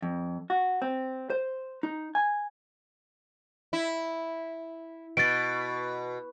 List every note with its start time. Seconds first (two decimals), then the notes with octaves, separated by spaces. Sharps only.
0.02 F2
0.50 F#4
0.82 C4
1.30 C5
1.83 D#4
2.15 G#5
3.73 E4
5.17 B2 A6 D7